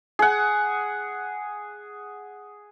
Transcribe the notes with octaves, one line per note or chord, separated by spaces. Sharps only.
G#4 F#5